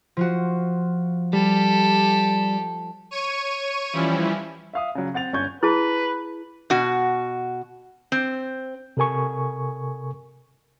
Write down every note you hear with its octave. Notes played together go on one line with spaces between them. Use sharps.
F3 F4 F#4
G3 G4 A4
C#5 C#6 D#7
E3 F3 G3 C#4 E4
E5 F5 D#6
C#3 F#3
C4 F#5 A6 F7
G1 C#4 C#6 G6 G#6
E4 G#4 B4 A5
B2 F#4
C4
C3 A4 A#4 G#5 C#6